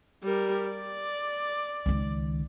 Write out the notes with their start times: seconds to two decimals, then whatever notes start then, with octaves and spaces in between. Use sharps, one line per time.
0.23 G3 A#4
0.70 D5
1.86 C#2 D#3